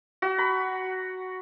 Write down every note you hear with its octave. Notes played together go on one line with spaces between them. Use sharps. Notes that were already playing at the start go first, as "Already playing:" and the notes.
F#4
B5